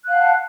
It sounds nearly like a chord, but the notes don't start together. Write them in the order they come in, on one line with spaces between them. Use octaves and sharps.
F#6 F5 F#5 A5